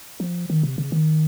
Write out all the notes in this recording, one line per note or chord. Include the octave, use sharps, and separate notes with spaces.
F3
D#3
C3
C#3
D#3